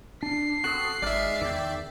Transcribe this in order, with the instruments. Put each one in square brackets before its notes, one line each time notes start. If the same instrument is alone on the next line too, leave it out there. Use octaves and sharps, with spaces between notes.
[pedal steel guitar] D4 [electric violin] C7
[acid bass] C4 [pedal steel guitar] F#4 A4 D#6 [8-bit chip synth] F#6
[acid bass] G#1 [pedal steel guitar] G#3 D#4 F6 [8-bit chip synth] D5 E5
[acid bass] E2 [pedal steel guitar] D#3 G5